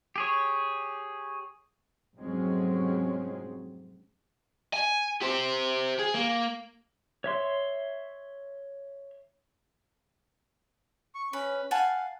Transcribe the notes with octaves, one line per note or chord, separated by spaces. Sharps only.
G4 G#4 C#5
F1 G#2 F#3 G#3 C4 C#4
G#5
G4 C5
G#4
A#3
C#5 E5 C6
C#6
C#4 B4
F5 F#5 G#5 A5